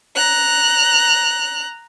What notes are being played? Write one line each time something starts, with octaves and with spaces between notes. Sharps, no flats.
A#5 F#6